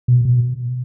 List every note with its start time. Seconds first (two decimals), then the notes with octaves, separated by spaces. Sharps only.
0.08 B2
0.25 B2